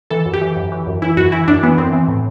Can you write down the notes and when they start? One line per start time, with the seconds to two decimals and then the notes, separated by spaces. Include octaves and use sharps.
0.10 E3 A4
0.26 F#2
0.33 G4
0.41 E3
0.57 F#2
0.72 E3
0.87 F#2
1.02 E3 E4
1.17 F#2 F#4
1.32 E3 E4
1.48 F#2 D4
1.63 E3 B3
1.78 F#2 C4
1.93 E3
2.08 A2